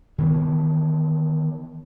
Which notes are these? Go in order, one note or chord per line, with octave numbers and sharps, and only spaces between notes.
D#3 E3 A#3 B3